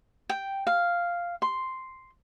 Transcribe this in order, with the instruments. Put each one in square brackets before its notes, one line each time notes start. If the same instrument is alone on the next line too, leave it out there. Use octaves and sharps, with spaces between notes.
[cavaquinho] G5
F5
C6